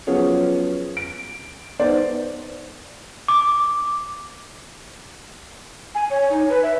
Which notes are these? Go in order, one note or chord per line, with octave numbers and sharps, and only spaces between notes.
F3 F#3 B3 C#4 G#4 C#5
D7
B3 D#4 C5 D5
D6
G#5
C#5
D#4
B4
E5